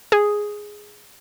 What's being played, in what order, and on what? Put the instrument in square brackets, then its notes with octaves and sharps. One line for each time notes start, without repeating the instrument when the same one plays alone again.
[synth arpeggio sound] G#4